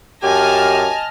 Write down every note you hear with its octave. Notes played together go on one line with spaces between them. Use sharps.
F#2 G4 D#5 G#5 A5 F6